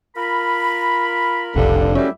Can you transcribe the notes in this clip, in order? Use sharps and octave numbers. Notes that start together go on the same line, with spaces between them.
F4 A#4 B5
F1 B1 G2 D3
F#2 G3 A3 C#4 E4 G4 E5